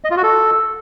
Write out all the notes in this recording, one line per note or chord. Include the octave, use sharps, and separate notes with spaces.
D#5
F4
F#4
A4